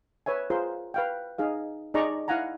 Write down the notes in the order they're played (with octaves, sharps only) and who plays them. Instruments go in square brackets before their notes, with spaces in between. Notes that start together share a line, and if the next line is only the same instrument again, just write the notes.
[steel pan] B4 C#5 E5 G#5
F4 G#4 A#4 C5 C6
B4 F5 G5
D#4 G#4 F5
D#4 G#4 D5 D#5 A#5 C#6
E4 F5 F#5 G#5 A#5